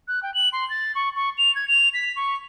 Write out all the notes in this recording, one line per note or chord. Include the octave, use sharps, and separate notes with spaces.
F#6
G5
F#7
C6
A6
C#6
C#6
F7
G#6
F7
B6
C#6